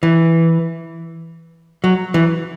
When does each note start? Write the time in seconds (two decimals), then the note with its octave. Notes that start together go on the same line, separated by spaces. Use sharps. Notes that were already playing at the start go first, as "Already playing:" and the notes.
0.03 E3
1.84 F#3
2.14 E3